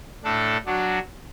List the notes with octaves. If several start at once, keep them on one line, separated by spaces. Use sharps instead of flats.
A2 A3 D4 A4
F#3 D4 F#4